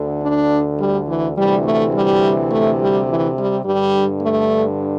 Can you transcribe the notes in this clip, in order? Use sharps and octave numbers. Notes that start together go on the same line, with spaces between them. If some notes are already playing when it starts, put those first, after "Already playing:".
Already playing: D2 D3
D4
G3
E3
D2 C3 E3 G3
A3
G3
A3
G3
E3
G3
G2 D3 G3
A3